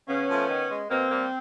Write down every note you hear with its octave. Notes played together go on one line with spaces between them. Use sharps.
C#3 B3 C#4
F3 A3
D#3
G#3
B2 A#3 C4
G3 A#3